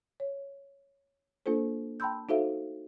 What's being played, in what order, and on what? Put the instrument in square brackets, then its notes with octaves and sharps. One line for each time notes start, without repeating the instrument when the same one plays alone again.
[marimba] C#5
A#3 D4 F4 A4 C5
G5 A5 B5 C6 E6 G6
D#4 F#4 A4 C5 E5 F5